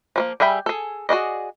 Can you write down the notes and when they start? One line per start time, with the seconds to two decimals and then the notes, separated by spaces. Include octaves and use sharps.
0.16 F3 G3 A#3
0.40 G3 G#4 E5 G5 B5
0.66 G#4 A4
1.09 F#4 G#4 D5 D#5